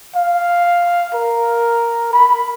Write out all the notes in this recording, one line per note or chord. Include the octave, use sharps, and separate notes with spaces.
F5
A#4
B5